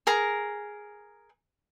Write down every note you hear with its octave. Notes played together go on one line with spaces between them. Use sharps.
G#4 A#4 A#5